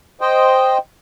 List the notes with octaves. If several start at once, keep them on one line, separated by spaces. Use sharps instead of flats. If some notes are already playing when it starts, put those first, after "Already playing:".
C5 D#5 G5